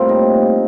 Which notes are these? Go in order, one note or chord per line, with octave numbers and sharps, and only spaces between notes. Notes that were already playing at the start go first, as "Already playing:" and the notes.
Already playing: A2 G3 A#3 C4 F4
D#4